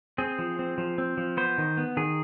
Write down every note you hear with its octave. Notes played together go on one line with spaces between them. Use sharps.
C4 G#4
F3
C4
F3
C4
F3
B3 C5
D#3
B3
D#3 G#4